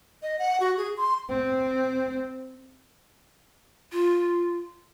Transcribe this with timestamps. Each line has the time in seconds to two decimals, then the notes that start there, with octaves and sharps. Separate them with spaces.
0.23 D#5
0.39 F#5
0.60 F#4
0.77 G#4
0.97 C6
1.29 C4
3.92 F4